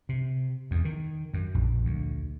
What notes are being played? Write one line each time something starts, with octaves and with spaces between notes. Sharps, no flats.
C3
E2
D#3
F#2
A#1
D2